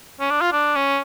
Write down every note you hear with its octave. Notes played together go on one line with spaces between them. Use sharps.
C#4
D4
F4
D4
C#4